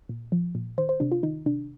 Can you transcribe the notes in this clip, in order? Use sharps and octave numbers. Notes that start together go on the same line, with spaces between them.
A#2
F3
A#2
D#3 C5
C5
C3 D4
F4
D#3 D#4
C3 D4